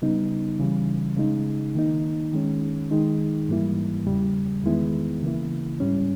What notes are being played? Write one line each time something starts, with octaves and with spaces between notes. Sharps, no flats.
C#3 G3 B3 D#4
C#3 E3 G3
C#3 G#3 D#4
D#3 A#3 D#4
D#3 G#3 C#4
D#3 G#3 D#4
G#2 E3 G3 A#3 E4
E2 C#3 G3
E2 D#3 G#3 B3 E4
C#3 E3 A#3 E4
G#2 G3 C#4